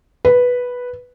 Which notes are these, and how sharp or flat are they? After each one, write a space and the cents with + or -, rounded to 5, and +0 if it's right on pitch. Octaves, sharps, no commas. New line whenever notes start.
B4 -5